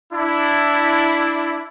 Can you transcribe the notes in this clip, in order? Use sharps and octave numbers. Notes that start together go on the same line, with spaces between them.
D4 E4